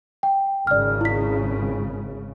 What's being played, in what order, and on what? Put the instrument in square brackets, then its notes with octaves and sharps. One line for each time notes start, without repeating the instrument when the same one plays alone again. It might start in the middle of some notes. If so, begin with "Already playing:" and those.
[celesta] G5
[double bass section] G#1 C#3 [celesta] D5 F6
[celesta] E4 B6